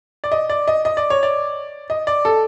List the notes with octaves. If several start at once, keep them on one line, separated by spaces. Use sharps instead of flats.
D5
D#5
D5
D#5
D#5
D5
C#5
D5
D#5
D5
A4